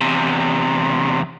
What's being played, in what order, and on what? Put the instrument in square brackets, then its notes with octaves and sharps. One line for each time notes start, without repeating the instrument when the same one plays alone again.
[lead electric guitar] E2 C3